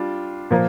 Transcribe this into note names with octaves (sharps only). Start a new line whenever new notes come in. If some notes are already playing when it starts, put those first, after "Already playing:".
Already playing: G3 D4 F4
A#2 F3 A#3